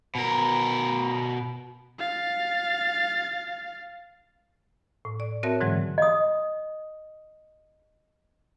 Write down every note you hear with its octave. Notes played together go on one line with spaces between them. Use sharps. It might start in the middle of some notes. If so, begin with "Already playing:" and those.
B2 A#4
F5 A6
A2
D5
C4 F#4 A#4 C#5 E5 A5
G#2 D3 E3 F#3 G#3
D#5 D#6